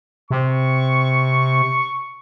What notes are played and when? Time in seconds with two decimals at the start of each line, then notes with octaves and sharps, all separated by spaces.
0.31 C3 C#6